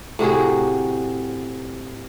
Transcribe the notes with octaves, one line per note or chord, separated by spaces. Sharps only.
A2 C3 F#4 G#4